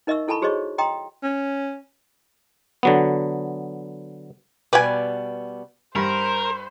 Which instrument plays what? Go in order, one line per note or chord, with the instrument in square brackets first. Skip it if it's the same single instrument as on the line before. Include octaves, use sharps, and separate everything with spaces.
[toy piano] D#4 A#4 D#5 E5 C#6 E6
E4 A4 G#5 A5 B5 C#6
F#4 G#4 C5 C#5 D#5 C#6
D#5 G5 A#5 C6 D#6
[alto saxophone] C#4
[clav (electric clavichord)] D3 F#3 B3
[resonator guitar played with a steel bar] B2 G3 B3 [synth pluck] B4 G5 [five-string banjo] D5 G#5
[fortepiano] G2 [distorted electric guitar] A#4 [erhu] C5